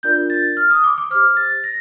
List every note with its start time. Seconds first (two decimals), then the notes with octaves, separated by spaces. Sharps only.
0.03 D4 F4 A#4 D5 G6
0.30 A6
0.57 F6
0.71 D#6
0.84 D6
0.98 D6
1.10 G4 C5 F6
1.37 A6
1.64 A#6